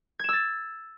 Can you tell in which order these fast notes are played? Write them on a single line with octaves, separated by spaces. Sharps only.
G#6 E7 E6 A6